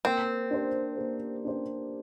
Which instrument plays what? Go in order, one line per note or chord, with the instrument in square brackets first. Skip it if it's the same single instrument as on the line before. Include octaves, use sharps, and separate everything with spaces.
[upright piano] A#3 [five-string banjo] C4
[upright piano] D4 G4 C5
A#3
D4 G4 C5